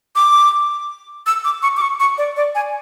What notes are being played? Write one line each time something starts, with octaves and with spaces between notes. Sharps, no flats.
D6
E6
D6
C#6
D6
C#6
C#6
D5
D5
G#5